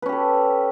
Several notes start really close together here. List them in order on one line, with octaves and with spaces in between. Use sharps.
B4 C#4 G4 A4